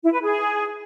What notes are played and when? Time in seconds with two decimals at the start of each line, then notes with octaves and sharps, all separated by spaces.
0.03 E4
0.12 B4
0.22 G#4